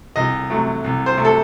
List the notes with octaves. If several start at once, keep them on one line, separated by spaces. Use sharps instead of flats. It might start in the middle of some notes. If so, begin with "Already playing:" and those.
C2 D#5
C3 F#3 A3
C2
C5
C3 F#3 A3
A4